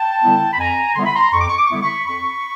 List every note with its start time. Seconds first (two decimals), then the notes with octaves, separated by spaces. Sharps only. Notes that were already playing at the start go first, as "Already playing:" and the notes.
Already playing: G5 A5
0.22 D3 G3 B3 E4
0.53 B5
0.59 F2 G#5 A#5
0.96 D3 G3 B3 E4 C6
1.06 B5
1.15 A#5 C6
1.34 F2 C#6
1.41 D6
1.49 C#6
1.58 D6
1.67 C#6
1.70 D3 G3 B3 E4 D6
1.82 B5 C#6
2.07 F2 B5 C#6